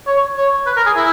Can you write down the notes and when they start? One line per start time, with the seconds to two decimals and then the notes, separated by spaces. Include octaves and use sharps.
0.07 C#5
0.37 C#5
0.67 B4
0.77 A#4
0.87 G#4
0.96 E4